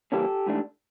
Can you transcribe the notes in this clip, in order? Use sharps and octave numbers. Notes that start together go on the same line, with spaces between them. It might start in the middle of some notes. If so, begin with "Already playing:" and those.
C#3 E3 G3 A#3 C#4 G4 A4
G#2 E3 A3 D4